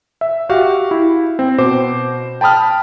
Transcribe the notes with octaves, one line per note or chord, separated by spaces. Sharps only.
E5
F#4 G4 F5
E4
C4
B2 C5 D6
G5 A5 B5 D#6 F6